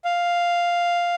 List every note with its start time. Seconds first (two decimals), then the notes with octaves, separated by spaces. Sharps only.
0.05 F5